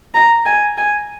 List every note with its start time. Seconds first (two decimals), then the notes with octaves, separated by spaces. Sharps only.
0.14 A#5
0.46 G#5
0.77 G#5